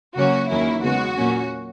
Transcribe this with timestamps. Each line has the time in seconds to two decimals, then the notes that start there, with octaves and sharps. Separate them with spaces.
0.16 C#3 F#3 A#3 C#4 F#4
0.50 E2 D#3 F#3 A#3 C#4 E4
0.83 C#3 G#3 B3 F#4
1.17 A#2 F#3 A#3 C#4